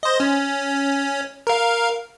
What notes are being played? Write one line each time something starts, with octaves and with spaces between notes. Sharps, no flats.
C5 D#5
C#4
A#4 F5